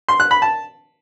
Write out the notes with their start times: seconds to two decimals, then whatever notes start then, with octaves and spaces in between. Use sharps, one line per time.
0.09 C6
0.20 F#6
0.31 B5
0.42 A5